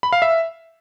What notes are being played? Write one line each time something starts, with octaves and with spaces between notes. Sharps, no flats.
B5
F5
E5